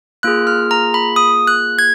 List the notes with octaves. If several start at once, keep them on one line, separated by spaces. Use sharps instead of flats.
A#3 F4 G#4 F#6
F6
A#5
B5
D#6
F#6
G#6